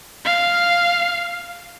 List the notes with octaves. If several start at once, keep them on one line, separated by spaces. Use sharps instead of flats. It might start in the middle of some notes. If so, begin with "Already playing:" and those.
F5